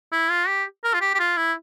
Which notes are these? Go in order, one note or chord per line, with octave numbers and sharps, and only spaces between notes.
E4
F4
G4
A#4
F4
G4
G4
F4
E4